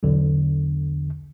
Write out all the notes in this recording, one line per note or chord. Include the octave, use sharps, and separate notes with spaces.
B1 E2 D3